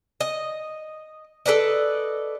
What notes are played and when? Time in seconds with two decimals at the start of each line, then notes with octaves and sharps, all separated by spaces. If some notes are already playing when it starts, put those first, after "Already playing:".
0.20 D#5
1.46 A4 B4 D5 D#5